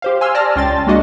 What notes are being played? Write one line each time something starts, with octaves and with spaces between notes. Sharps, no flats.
G4 C5 F5
G#5 C6 E6 F6
D5 A5 F6 A#6
C#2 C#4 G5 C6 A6
G#3 A#3 D4 F#4 D#5